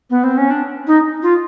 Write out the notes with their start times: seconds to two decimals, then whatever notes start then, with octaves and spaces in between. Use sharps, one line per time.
0.09 B3
0.23 C4
0.37 C#4
0.50 D4
0.86 D#4
1.22 F4